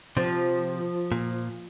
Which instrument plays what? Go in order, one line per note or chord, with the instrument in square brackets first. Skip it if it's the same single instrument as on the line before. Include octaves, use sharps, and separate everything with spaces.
[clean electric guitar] C3 [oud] F3
[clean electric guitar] A#2